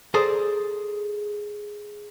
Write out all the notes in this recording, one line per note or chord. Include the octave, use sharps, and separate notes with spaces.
G#4 A4 C5 D5 A#5